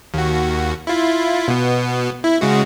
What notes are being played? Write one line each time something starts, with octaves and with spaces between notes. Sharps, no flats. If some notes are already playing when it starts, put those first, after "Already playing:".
D#2 F#4
E4 F4
B2 B3
E4
C#3 G#3 F#4